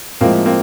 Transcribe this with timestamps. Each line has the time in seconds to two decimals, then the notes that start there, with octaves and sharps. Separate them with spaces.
0.21 A2 F3 G#3 A#3 C4
0.46 A#3 C4